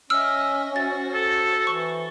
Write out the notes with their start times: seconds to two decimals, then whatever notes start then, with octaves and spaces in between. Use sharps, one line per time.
0.10 C#4 D#5 E5 E6 F6
0.76 F#4 C5 A6
1.14 A4
1.67 E3 C#6